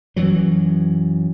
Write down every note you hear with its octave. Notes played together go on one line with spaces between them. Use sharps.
F#2 E3 F#3